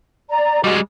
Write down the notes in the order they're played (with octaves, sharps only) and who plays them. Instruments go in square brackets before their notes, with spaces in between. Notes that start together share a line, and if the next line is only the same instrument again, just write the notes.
[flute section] D5 A#5
[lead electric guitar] G3 G#3 [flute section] F#4 D#5